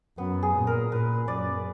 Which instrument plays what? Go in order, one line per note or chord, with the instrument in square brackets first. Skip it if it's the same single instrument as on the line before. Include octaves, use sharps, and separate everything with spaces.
[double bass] F#2 [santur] B3
[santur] G#4
[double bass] A#2
[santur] A#4
[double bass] A#2 [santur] B4
[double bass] F#2 [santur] D5